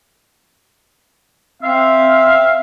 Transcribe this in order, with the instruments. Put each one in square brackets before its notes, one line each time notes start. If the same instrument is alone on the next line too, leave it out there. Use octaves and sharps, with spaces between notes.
[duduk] C4 [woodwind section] E5 F5